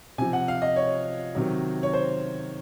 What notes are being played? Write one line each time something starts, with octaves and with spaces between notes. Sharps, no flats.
C3 F3 G#5
F#5
F5
D#5
C#5
C3 D#3 F#3
C#5
C5